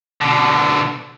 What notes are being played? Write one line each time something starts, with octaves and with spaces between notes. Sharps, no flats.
B2 D3